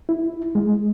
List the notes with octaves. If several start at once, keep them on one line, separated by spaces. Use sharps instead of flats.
E4
G#3